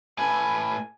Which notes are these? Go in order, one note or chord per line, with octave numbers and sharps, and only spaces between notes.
A2 B4 G#5